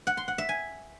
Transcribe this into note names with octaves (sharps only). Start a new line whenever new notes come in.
F#5
C6
F#5
E5
G#5